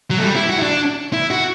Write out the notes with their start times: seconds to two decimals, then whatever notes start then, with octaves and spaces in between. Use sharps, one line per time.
0.11 F#3
0.18 A3
0.23 G3
0.36 E4
0.49 F#4
0.58 E4
0.62 D4
1.13 E4
1.31 F#4